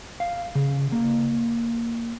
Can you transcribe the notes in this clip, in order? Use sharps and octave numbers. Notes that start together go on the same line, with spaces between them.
F5
C#3
A#3